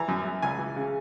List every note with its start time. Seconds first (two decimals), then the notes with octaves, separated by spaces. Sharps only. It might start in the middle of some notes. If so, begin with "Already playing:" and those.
Already playing: E3 A#5
0.08 F#2
0.25 F#2
0.42 C#2 G#5
0.59 E3
0.76 C#3